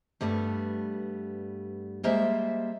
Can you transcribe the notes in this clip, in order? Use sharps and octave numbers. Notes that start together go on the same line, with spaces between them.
G2 G3 A3 B3
G3 G#3 A#3 C5 E5